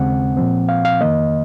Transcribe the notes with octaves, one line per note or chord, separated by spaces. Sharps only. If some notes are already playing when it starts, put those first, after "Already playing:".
Already playing: D#2 C#3 G#3 C4 F#5
A#2 F3 C4
F5
F5
F2 D#3 A#3 D#5